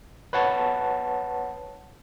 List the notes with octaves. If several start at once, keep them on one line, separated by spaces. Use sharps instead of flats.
B4 C#5 F#5 A5